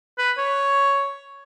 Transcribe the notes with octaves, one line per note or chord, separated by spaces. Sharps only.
B4
C#5